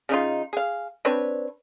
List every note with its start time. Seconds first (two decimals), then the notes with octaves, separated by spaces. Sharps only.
0.09 C#3 D#4 F4
0.53 G#4 F5
1.05 C4 D4 B4 C#5